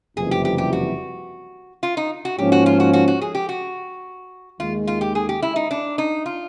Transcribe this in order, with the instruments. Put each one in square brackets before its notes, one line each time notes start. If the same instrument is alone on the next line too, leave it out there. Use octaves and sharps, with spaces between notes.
[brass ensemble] F#1 F2 C3 E3 G3 [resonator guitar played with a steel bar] G#4
[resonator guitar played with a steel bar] G4
G4
G4
F#4
F4
D#4
F#4
[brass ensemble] G#2 F3 A#3 C#4 [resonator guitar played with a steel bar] G4
[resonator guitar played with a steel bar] F#4
F4
F#4
F#4
F#4
G#4
G4
F#4
[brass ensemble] D#2 D#3 G#3 [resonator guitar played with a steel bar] F4
[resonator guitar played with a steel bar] F4
G4
G#4
G4
E4
D#4
D4
D#4
F4